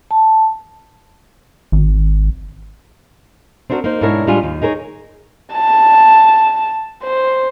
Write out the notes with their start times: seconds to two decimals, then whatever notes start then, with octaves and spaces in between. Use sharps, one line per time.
0.11 A5
1.72 G#1
3.70 C4 D4 E4 F#4 A#4
3.84 A#3 D#4 C5
4.01 G#2 B2 D4 E4 A#4 C#5
4.27 A2 G3 G#3 D4 F4 G#5
4.43 D#2
4.62 D#4 G#4 A#4 C5 C#5
5.53 A5
7.03 C5